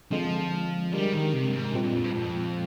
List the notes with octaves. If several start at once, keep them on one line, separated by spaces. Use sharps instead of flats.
D3 F3 G#3 C4
G3 G#3 D4 G4 A#4
D#3
C3
G2
G#2
G2 A#2 G#3 C4 F4
G2
F2
G2
F2